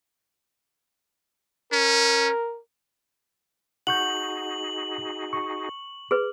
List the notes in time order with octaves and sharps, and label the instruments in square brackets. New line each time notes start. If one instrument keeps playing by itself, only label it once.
[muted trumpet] C#4 [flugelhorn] A#4
[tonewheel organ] D#4 F#4 G#4 [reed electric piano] F#5 C#6 G6 [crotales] F#7
[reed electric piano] C#6
[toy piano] G#4 B4